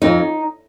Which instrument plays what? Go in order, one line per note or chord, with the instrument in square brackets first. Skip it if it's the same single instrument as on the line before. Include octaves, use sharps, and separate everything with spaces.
[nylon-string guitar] F2 D#4